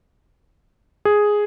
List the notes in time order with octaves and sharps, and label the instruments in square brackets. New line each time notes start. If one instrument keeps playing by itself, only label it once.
[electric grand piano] G#4